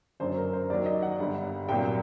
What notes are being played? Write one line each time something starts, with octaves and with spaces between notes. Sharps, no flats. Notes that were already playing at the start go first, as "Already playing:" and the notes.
F#1 F#2 D3 F#3 C5
A#4
C5
D#2 D#3 F#3 D5
D#5
F#5
G1 G2 D3
C2 A#2 F#3 G5